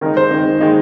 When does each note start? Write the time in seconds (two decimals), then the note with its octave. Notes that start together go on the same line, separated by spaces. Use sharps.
0.01 D#3 G#3 D#4 A#4
0.17 C5
0.31 D#3 G#3 D#4
0.60 D#3 G#3 D#4